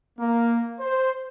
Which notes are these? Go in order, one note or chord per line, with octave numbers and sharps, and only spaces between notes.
A#3
C5